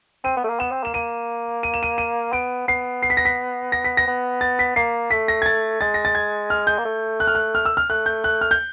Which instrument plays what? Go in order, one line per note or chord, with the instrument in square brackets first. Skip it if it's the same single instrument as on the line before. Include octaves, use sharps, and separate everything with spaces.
[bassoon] C4 [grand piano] D#7
[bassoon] B3
A3
A#3
[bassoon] B3 [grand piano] E7
[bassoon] C4
[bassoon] A#3 [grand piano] E7
[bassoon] A#3 [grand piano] D#7
[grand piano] D#7
E7
D#7
D#7
[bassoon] B3 [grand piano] D7
[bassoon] B3 [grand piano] C7
[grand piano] C7
B6
A#6
B6
A#6
B6
A#6
[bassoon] B3
[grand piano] A6
B6
[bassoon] A#3 [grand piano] C7
[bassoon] A3 [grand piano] B6
[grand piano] A#6
G#6
A6
[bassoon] G#3 [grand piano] A6
[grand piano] A#6
A6
G#6
F6
G6
[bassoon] A#3
A3
[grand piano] F#6
F6
F#6
F6
E6
F6
[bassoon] A3 [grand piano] F#6
[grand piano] G6
F#6
F6
G6